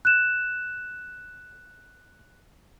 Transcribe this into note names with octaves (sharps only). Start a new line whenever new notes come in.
F#6 E7